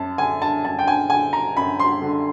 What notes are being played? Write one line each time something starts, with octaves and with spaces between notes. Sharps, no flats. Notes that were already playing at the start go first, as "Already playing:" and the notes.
Already playing: F#2 A5
D3 G#5
A5
F#2 A5
G5
G#5
D3 G#5
A#5
F#2 B5
C6
D3